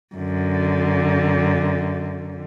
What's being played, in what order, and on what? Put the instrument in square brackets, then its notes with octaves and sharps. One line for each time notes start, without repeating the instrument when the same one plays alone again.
[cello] F#2 D3